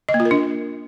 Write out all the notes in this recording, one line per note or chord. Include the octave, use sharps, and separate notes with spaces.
D#5
A#3
F4
A#4
D4